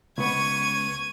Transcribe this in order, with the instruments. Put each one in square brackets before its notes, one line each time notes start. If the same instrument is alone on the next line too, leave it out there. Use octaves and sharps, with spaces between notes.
[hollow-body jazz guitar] C#2 B3 [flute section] C#6 [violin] G#6 D#7